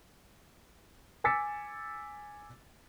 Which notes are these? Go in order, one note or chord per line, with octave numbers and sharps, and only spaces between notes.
G#5 D6 E6 A6 B6 C#7